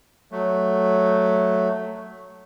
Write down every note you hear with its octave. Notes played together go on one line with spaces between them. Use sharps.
F#3 A3